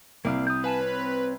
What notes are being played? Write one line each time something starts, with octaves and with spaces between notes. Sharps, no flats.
C2 A#3 D5 F5
D#6 G6
B4 F5 G#5 A5
C4 C#5